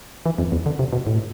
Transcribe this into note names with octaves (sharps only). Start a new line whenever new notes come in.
E3
F2
E2
D3
C3
B2
A2